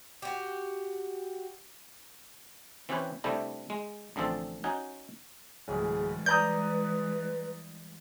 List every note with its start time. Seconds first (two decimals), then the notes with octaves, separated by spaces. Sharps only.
0.22 F#4 G4
2.89 E3 C4 C#4 G4 B4 C#5
3.24 C3 G3 A3 D4 E4
3.70 G#3
4.16 A1 D3 F3 C4 A4
4.64 C#4 D#4 F#4 G#5
5.68 D1 E3 G3 G#3 G#4
6.26 B4 D5 A#5 D#6 G6